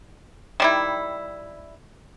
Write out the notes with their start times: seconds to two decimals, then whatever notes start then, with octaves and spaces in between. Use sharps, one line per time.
0.60 D#3 G3 E4